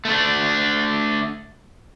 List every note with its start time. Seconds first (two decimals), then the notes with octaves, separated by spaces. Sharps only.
0.05 A3 D4